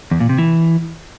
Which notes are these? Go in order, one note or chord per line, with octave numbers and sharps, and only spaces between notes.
E2
A#2
C3
E3